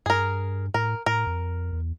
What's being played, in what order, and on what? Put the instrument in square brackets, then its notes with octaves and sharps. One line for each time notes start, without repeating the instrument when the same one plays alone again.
[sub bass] G2 [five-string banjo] G#4 A#4
[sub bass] A2 [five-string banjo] A#4
[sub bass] A2 [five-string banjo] A#4
[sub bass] F2
E2